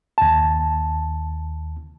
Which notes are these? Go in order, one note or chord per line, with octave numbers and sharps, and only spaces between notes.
D#2 A5